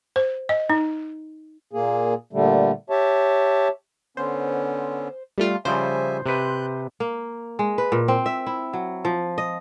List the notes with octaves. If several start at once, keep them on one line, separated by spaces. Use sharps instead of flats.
C5
D#5
D#4
A#2 A#3 G#4
A#2 D3 G3 A3
G4 C#5 E5 A5
D3 B3 C#4 C5
G3 A3 F4
C#3 F3 G3 C5 E5 G#5
C3 B4 F#6 G6
A#3
G#3
B4
A#2
C4
E5
E4
F#3
F3
D#5